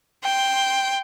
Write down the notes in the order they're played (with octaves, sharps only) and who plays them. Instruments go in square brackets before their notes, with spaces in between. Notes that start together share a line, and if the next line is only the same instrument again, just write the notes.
[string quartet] G5 C6